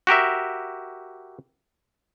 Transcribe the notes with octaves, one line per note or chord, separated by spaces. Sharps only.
F#4 G4 A#4 E5